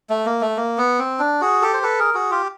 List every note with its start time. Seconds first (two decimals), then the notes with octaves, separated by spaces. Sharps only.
0.10 A3
0.26 A#3
0.41 A3
0.57 A#3
0.78 B3
0.99 C4
1.19 D4
1.41 F#4 G#4
1.62 G4 A4
1.74 C5
1.83 A4 B4
1.99 G#4 A#4
2.14 F#4 G#4
2.31 F4 G4